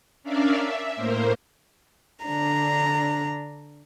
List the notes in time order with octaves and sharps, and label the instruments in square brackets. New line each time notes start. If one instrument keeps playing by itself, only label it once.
[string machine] C#4 D4 A#4 D5 E5 F5
E5
A2 A#3 A#4 C5
[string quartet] D3 D4 A#5